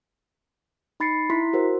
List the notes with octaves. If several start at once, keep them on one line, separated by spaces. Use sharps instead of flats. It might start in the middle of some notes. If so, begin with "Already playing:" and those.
D#4 B5 A6 C7 C#7
E4 C6 B6
F#4 A#4 C5